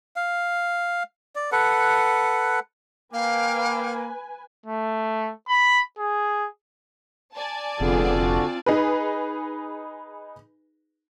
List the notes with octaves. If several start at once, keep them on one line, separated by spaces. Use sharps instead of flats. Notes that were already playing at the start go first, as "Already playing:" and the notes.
F5
D5
A4 B4 F#5
A#3 B4 F5 G5 G#5 D6
A3
B5
G#4
D5 G#5 A5
F1 D3 B3 C4 F4 G#4
D3 D4 F#4
D#4 G#4 B4